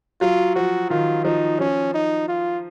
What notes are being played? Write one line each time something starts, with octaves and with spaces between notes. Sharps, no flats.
F#3 F4
F3 F#4
D#3 F4
F3 D#4
F3 C#4
D#4
F4